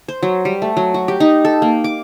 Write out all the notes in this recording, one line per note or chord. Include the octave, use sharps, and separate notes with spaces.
C5
F#3
G3
A3
F#3
F#4
G4
D#4
A4
A#3
D6